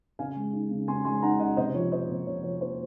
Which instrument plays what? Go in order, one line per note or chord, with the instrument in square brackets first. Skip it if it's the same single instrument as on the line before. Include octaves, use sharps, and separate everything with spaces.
[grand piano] C#3 F5 G#5
G#3
D#4
C#3
C#3 G#5 C6
G#3 G#5 C6
D#4 F#5 A#5
C#3 D#5 F#5
C3 C5 D#5
F3 C#5
A#3 C5 D#5
C3
C3 C#5
F3 C#5
A#3 C5